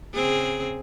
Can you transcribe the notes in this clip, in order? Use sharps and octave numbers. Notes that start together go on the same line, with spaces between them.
C#3 C4 G#4